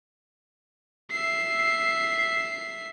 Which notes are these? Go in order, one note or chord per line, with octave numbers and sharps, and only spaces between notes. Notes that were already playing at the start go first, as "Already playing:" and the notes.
E5 C7